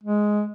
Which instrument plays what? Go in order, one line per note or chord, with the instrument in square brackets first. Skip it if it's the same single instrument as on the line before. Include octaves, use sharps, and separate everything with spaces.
[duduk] G#3